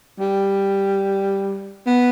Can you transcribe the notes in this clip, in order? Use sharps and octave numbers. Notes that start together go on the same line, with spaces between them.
G3
B3